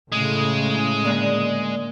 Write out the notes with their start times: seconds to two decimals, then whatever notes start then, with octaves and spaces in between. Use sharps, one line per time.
0.12 A2 C#3 G#3
1.05 A#2 D3 F#6